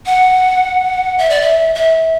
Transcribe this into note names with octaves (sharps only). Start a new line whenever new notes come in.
F#5
E5
D5
E5
E5